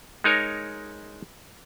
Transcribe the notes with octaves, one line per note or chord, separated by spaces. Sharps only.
G#3 D#4 A#4 C#5